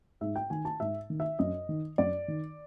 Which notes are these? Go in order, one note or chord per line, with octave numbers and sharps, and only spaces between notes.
G#2 E5
G5
D#3 G#5
A5
G#2 E5
D#3
E5
F#2 D#5
D#3
F#2 D5
D#3